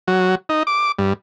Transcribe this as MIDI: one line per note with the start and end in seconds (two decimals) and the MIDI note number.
0.08 0.35 54
0.49 0.63 63
0.67 0.92 86
0.99 1.13 43